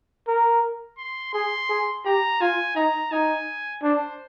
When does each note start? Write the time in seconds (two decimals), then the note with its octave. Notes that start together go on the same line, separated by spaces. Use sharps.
0.28 A#4
0.98 C6
1.33 G#4 C6
1.69 G#4
2.05 G4 A#5
2.41 F4 G#5
2.76 D#4 A#5
3.12 D#4 G#5
3.83 D4 C5